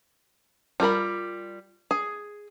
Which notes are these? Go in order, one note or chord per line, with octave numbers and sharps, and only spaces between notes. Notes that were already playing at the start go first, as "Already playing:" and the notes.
G3 F4 A#4 B5
G#4